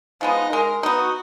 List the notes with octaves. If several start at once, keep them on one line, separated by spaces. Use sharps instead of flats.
F3 G#3 B3 D#4
G#3 A#4
B3 D#4 F#4